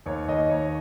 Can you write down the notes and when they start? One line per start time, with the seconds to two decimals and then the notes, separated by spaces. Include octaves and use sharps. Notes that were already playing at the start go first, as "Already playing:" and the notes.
0.06 D#2 C#5
0.28 D#2 D#5
0.50 D#2 C#5